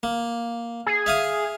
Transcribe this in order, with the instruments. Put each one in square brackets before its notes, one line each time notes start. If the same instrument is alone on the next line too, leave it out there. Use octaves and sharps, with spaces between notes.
[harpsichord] A#3
[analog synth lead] G#4
[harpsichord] E5 F5 D#6